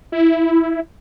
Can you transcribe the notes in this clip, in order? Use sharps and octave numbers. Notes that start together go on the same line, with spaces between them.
E4